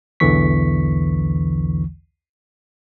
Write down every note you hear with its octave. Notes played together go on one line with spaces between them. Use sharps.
B1 E2 D3 E3 C#6 B6